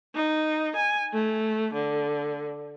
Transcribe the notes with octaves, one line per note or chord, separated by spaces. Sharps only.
D#4
G#5
A3
D3